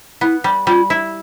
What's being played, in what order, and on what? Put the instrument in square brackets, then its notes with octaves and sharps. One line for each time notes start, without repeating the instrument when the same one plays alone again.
[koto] B3 [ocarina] E4
[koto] G3
[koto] G3 [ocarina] F4
[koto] E4